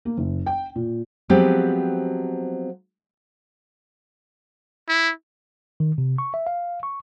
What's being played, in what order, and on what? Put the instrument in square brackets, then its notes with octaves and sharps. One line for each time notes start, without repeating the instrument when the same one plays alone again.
[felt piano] A#3
F#1
G5
A#2
[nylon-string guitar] F3 F#3 G#3 B3 C4 G4
[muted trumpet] E4
[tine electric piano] D#3
C3
C#6
E5
F5
C#6